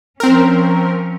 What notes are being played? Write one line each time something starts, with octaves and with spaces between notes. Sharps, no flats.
F3 C4 C#4 A#4